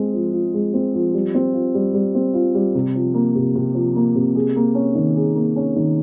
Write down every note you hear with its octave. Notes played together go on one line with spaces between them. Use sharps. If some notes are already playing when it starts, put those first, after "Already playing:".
Already playing: G#3 C4
F3
F4
G#3
C4
F3
G3
C4
F4
G3
G3
C4
F4
G3
C3
F3
A#3
C3
C3
F3
A#3
C3
G#4
A#3
C#4
D#3
G#4
A#3
C#4
D#3